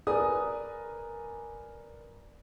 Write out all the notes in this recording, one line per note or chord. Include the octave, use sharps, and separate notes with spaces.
A#4 B4 D5 G#5 A#5 D#6